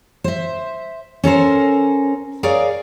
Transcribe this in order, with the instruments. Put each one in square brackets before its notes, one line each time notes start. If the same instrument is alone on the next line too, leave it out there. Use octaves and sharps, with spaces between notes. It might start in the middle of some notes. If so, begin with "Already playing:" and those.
[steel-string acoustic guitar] C5 E5
C#4 A4 A#4 C5
G#4 A#4 C#5 D5 F5